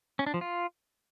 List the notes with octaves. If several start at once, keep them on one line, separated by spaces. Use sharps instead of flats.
C#4
D4
F3
F4